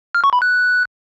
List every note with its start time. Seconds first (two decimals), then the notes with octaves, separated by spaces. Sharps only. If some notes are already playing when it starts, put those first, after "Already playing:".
0.15 F6
0.24 C#6
0.33 B5
0.42 F#6